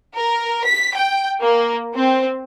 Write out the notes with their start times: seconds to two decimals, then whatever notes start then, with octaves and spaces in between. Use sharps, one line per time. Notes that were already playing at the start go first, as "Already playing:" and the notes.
0.15 A#4
0.64 B6
0.95 G5
1.40 A#3
1.94 C4